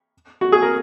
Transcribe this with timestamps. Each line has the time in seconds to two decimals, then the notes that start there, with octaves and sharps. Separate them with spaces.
0.41 F#4
0.52 G#4
0.62 A#4